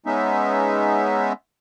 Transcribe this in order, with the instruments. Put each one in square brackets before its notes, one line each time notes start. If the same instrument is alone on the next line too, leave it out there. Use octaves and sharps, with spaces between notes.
[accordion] G#3 B3 C#4 D#4 E5